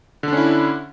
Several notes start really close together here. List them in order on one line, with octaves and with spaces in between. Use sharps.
D3 D4 C#4 E4